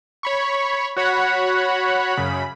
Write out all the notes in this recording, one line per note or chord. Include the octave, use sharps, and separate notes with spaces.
C#5 B5 C#6
F#4 C#5 F#5 B5
F#2 C#3 B5